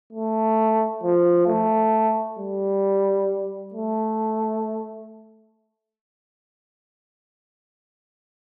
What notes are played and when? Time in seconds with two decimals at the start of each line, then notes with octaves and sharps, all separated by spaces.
0.13 A3
1.03 F3
1.48 A3
2.39 G3
3.74 A3